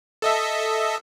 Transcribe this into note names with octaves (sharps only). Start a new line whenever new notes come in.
A4 D#5 E5